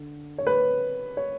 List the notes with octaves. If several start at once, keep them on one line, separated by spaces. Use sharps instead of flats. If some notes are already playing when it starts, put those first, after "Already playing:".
Already playing: D3
C#5
B4
C#5